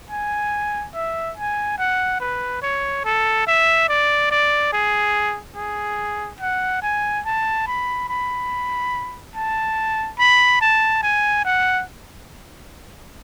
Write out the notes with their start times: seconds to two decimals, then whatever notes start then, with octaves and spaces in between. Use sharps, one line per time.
0.11 G#5
0.94 E5
1.37 G#5
1.78 F#5
2.20 B4
2.62 C#5
3.05 A4
3.47 E5
3.89 D5
4.31 D5
4.73 G#4
5.56 G#4
6.40 F#5
6.83 G#5
7.25 A5
7.67 B5
8.09 B5
9.36 A5
10.19 B5
10.61 A5
11.03 G#5
11.45 F#5